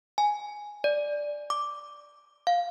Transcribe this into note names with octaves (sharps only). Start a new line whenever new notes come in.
G#5
D5
D6
F5